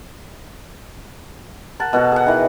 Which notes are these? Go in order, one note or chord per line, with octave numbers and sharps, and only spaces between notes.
A#4 F#5 A5
B2 F#4 A4
G#4 F#5
D#3 E3